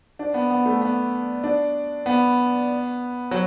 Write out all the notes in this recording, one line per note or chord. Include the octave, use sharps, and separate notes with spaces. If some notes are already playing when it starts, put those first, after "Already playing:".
D4
B3
B3
A3
B3
D4
B3
F#3